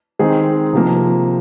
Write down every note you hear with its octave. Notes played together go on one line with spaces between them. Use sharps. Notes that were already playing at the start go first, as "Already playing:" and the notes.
D#3 G#3 C4 D#4 G#4
C3 F3 A#3